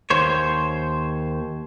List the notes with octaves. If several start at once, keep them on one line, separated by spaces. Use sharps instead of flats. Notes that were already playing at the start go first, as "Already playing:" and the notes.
D#2 C5 C#5